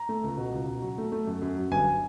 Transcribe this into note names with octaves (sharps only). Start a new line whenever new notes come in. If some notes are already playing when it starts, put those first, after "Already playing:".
Already playing: A#5
A3
C#2
B2
C#2
B2
F#3
A3
A3
F#2
F#2
F#3
G1 G#5